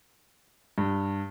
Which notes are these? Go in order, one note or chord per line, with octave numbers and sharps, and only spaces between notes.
G2